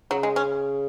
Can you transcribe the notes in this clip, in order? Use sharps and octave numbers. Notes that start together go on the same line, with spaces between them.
C#3 F#3
G#3
C#4